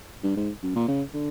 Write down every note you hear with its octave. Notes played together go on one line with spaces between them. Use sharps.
G2
G#2
F#2
A#2
C#3
D3